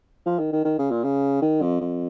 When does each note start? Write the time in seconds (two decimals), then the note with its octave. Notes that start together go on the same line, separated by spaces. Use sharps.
0.26 F3
0.39 D#3
0.52 D#3
0.64 D#3
0.78 C#3
0.91 A#2
1.04 C#3
1.42 D#3
1.62 F2
1.81 F2